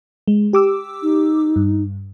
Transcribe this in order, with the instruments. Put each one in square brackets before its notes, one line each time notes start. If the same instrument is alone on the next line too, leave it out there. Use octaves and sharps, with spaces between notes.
[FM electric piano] G#3
G4 D6 E6
[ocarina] D#4
[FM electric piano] G2